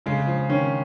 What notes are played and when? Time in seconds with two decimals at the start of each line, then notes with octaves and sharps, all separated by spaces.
0.06 C#3 G#3
0.27 F3
0.49 D#3 C#4